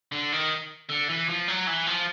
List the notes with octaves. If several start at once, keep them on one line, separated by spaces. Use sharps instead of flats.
D3
D#3
D3
E3
F3
F#3
E3
F3